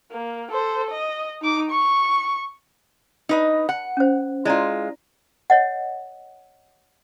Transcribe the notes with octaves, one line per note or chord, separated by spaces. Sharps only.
A#3
A4 C5
D#5
D#4 D6
C#6
D#4 B4 D#5
F#5
C#4 C5
G#3 E4 F4 D5 A#5
C#5 D#5 F#5